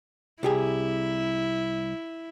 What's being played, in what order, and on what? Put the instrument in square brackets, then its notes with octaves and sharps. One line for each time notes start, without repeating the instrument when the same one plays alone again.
[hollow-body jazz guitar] C2 G4 G#4 [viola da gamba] E4